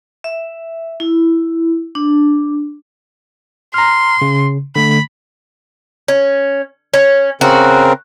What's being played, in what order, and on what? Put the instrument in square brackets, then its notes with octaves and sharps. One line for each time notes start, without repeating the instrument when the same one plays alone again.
[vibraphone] E5
E4
D4
[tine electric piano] A#5 F6 [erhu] C6
[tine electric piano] C#3
[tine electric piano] D3 A3 [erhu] B5
[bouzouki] C#4
C#4
[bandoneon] C#3 C4 A#4 [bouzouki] F#4